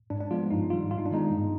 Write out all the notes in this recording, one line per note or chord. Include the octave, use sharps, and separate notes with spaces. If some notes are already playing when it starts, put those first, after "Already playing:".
G#2 D4
D4
F3 G#3 B3 F4
G2 D#4
D#3 G3 F4
G#2 F4
D#4
D4
D#3 G#3 B3 D#4
G2